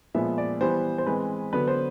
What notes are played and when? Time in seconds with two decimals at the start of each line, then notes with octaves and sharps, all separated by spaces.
0.14 A#2 F3 G#3 B3 E5
0.38 D5
0.61 E3 G3 B3 C5
0.98 C5
1.06 E3 G#3 C4 B4
1.53 D3 F#3 B3 B4
1.68 C5